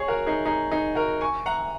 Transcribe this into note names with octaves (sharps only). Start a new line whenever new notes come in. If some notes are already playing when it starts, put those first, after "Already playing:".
Already playing: G#4 C#5
F#4 A#4
D#4 G#4
D#4 G#4
D#4 G#4
F#4 A#4
G#5 C#6
F#5 A#5